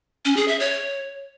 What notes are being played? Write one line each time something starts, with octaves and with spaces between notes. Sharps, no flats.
C#4
G#4
E5
C#5